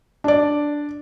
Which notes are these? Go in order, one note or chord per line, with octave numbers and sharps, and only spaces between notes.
D4 D5